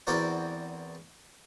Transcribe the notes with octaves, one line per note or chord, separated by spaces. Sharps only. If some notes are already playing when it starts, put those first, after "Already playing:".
E2 C4 F#4 A#4 D5